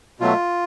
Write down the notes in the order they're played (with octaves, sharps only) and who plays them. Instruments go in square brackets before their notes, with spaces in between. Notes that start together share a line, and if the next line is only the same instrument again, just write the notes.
[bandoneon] B2 F#3 A3 F4